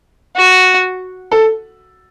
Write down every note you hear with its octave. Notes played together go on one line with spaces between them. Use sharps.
F#4
A4